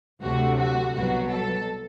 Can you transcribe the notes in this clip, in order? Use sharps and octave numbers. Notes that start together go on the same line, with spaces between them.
D2 C3 F#3 A3 F#4
F#4
C2 B2 F#3 F#4
A4